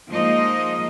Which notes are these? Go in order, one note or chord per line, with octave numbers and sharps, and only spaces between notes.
F3 G#3 A#3 D#4 D#5